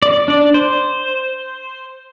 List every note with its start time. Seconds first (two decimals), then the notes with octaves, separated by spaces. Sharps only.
0.02 D5
0.28 D4 D5
0.54 C5